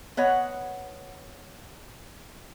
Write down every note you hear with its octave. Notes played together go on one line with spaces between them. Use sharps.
B3 C#5 D#5 F#5